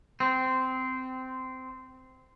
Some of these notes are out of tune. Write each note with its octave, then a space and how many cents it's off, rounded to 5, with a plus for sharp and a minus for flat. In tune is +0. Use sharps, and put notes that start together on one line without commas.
C4 -15